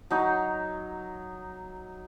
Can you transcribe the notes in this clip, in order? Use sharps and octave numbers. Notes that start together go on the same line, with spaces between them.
F#3 D#4